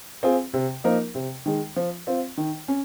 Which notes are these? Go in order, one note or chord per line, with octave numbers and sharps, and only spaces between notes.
C4 F4 G#4
C3
F3 A#3 D#4 A#4
C3
D#3 G#3
F3
C4 F4
D#3
C#4